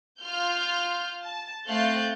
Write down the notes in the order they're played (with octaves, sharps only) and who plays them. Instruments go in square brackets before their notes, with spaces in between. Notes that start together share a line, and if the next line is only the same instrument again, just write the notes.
[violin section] F4 F6 G6
A5
A3 C4 F5 F#6 G6 A6